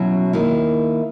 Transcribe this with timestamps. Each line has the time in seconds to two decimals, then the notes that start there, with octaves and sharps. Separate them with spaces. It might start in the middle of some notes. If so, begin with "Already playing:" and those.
Already playing: B2 F#3 C#4 E4
0.33 D#3 A#3 E4